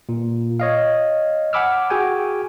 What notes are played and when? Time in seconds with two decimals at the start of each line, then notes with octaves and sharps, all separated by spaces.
0.09 A#2
0.60 C#5 D#5 F5
1.53 F#5 G#5 B5 D6 E6 F6
1.90 F#4 G#4 G5 G#5